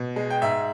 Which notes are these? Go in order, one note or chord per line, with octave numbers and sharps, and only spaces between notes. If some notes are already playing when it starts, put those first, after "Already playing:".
Already playing: B2
G#3
G5
G#2 E5